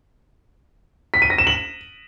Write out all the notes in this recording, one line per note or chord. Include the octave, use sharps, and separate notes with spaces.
B6
D#7
A#6
E7
F#7